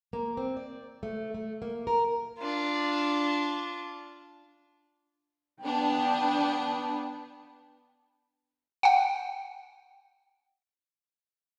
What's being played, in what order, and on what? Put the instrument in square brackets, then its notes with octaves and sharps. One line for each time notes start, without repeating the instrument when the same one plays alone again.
[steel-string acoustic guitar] A#3
C4
D5
A3
A3
A#3
A#4
[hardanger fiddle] D4 F4
[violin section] B3 D4 [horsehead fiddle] G5
[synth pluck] F#5 G5